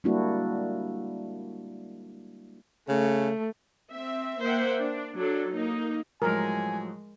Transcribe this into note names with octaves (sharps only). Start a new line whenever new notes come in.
G3 G#3 A#3 D4 E4 F#4
C#3 A3
C4 E5
A#3 C5 E5 F#5 G5
D4
F#3 D4 A4
A#3 D#4
A2 F3 F#3 G#3 A#4 G#5